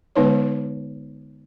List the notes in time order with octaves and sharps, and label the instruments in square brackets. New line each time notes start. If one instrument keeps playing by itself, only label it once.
[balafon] D3 G#3 B3 D#4 B4 C#5